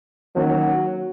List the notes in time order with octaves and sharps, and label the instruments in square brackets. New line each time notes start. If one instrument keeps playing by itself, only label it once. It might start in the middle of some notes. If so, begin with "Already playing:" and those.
[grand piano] D#3 A#3 C#4 F#4 [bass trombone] F#3